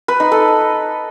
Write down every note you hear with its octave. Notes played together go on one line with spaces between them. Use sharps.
B4
D#4
A4